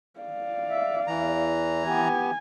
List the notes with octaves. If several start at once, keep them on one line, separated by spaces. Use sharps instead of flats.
D5 F5
E5
E2 E3 A#5
B3 G4 G#5